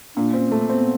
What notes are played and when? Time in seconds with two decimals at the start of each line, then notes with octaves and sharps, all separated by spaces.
0.16 A#2 D4
0.33 C4 C#4
0.52 A3
0.69 B3 C4